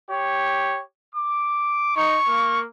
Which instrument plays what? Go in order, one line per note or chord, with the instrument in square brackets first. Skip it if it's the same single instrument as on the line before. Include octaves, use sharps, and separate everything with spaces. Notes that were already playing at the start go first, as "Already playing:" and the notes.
[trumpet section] G4 C#5
D6
[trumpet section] D#4 [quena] C#6
[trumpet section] A#3